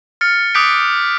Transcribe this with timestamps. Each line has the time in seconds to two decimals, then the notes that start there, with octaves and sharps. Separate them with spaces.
0.21 F6 A6 C#7
0.55 D6 D#6 F#6 G6 B6 D7